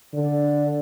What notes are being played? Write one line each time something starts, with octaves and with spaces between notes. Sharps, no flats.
D3 D5